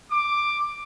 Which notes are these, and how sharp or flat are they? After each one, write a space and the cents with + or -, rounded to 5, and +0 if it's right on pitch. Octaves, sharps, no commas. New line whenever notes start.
D6 +10